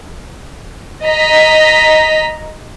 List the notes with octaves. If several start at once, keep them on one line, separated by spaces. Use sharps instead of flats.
D#5 A#5 B6